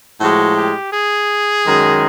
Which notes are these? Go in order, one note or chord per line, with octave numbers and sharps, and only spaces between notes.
A2 F3 G#3 F#4
G4
G#4
F#2 D#3 G#3